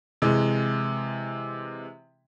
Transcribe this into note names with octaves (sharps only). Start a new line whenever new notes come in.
C3 E3 G#3